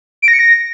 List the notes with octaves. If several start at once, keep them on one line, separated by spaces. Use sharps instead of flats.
D7
A#6
C#7
A#6